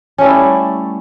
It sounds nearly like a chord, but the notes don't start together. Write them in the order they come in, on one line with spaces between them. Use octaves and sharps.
C#4 A3 G3 E4